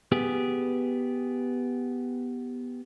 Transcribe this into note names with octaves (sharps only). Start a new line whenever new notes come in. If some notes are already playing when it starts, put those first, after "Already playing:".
B3 G4 G#4